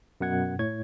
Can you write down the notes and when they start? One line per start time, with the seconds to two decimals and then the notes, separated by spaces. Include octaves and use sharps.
0.21 F#2 B2 F#5 G#6
0.59 A2 C#5 G#6